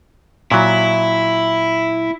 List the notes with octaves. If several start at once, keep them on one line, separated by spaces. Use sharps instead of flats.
A#2 F#3 E4